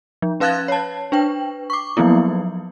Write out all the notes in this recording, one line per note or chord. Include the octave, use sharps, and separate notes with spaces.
F3
C#4 B4 F5 F#6 G#6 A6
C#5 A5
D4 B4 G5
C#6 D6
F3 F#3 A#3 B3 E4